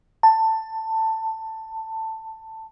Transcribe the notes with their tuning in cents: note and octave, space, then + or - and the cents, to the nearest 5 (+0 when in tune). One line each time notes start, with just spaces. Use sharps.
A5 +15